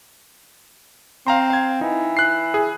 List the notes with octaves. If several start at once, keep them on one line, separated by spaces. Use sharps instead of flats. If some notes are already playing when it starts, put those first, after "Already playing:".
C4 F5 A#5 C6
F5 G#6
E3 D#4
F#6 C7
G#4